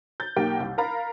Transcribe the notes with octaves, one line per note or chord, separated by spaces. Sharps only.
G6 A6
B1 A#3 G4 F#5 G5
C2
A#4 F5 A#5 B5 A6